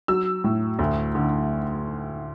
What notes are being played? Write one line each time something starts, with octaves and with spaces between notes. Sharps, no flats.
F#3 E6
A2
D2
D3